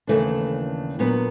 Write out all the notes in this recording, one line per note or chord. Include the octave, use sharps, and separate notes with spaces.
D#2 C#3 E3 A3 D4
A#2 F#3 B3 D4